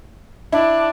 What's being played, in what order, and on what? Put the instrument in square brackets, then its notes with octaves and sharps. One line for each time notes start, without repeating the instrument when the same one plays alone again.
[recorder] D4 [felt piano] E4